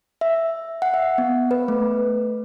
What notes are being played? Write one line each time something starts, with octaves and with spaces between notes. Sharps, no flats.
E5
F#5
E5
B3
B4
A3